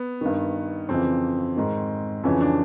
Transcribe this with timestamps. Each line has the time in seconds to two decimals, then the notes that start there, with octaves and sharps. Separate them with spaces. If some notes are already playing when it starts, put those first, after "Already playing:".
Already playing: B3
0.21 G2 D#3
0.89 F2 C#3 E3 C4
1.57 G#2 D#3
2.24 F2 C#3 E3 C#4
2.41 D4